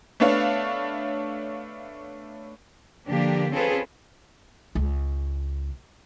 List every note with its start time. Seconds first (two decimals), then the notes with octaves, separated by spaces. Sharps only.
0.20 A3 B3 D4 C#5 F5
3.07 D3 F3 A#3 D4 G4
3.52 C4 C#4 F4 G#4 A4 B4
4.75 C#2